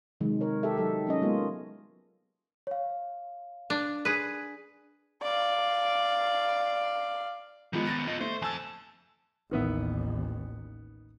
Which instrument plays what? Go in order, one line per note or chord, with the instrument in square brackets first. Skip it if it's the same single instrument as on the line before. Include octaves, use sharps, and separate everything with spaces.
[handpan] C3 D#3 F#3 G#3
A#4 C#5
G4 A4 E5
F#3 D#4 A4
F#3 C#4 D#5
F#3 G#3 A#3 B3 F4
[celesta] C#5 F5
[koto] D4
G#4 B4
[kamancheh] D5 F5
[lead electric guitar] D#3 B3 [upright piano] F3 G#3
[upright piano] A6 A#6 C#7
[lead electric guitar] F4 D#5
[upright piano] A3 [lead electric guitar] C5
[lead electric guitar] F2 A5 [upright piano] G#5 E6
[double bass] A1 D#2 [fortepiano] D#3 B3 E5